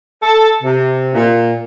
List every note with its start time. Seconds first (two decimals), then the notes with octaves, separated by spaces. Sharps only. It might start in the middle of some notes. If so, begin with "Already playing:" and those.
0.23 A4
0.63 C3
1.14 A#2